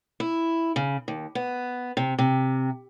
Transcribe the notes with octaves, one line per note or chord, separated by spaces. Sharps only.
E4
C#3
D#2
B3
C3
C3